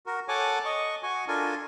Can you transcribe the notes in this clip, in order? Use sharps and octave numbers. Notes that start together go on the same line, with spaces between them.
F#4 A#4
A4 C#5 F#5 G#5 D6
D#5 C#6
F#4 G#5 C#6
D4 F4 A4 A#4 G#5